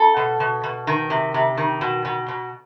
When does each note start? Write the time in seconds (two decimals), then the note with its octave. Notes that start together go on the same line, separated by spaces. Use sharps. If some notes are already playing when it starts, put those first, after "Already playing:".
Already playing: A4
0.17 B2
0.40 B2
0.64 B2
0.87 D#3
1.10 C3
1.34 C3
1.57 D#3
1.81 B2
2.05 B2
2.28 B2